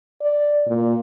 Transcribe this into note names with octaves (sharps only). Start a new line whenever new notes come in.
D5
A#2